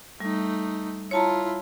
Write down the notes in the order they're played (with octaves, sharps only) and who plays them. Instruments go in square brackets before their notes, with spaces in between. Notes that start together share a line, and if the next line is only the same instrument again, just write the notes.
[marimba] G3 [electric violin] A3 D#4
[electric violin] E4 F4 [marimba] C#5 A5 A#5